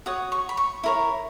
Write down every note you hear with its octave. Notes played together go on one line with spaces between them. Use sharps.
F#4 C#5 D#6
C#6
B5
C#6
E4 A#4 C#5 B5